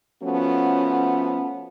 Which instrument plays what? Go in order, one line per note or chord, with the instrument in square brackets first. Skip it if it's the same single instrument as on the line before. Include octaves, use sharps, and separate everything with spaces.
[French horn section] F3 A3 B3 C#4 F#4